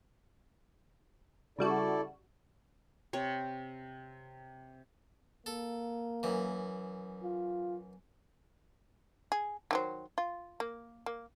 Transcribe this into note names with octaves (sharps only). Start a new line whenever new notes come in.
C#3 G3 E4 F#4 A4 D5
C3 C#5
A#3 A4
F#2 E3
F4
G#4
D#3 F#3 C5
F4
A#3
A#3